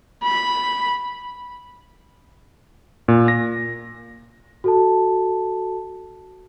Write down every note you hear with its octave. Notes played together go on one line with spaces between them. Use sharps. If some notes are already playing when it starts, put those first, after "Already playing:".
B5
A#2
A#6
F#4 A4 A5